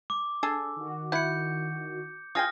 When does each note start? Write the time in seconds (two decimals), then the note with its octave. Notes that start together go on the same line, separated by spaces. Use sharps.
0.10 D6
0.43 D4 G#4 A4
0.76 D#3 F#4
1.12 E4 F#5 G6 C#7
2.35 F4 G#4 G5 D#6 F6 A#6